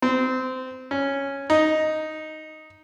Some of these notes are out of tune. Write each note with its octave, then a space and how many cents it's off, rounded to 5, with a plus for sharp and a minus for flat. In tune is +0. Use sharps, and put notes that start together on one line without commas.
C4 -20
C#4 -5
D#4 +0